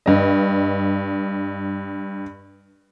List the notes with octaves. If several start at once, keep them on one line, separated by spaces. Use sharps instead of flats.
G2 D#5